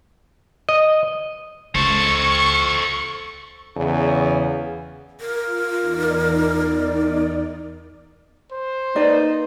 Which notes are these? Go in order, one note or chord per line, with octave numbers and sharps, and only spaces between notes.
D#5
C#2 A4 C5 C#6
E2 C#3
F4 A#4
E2 D#4 D5
C5
A#3 D#4 B4 D5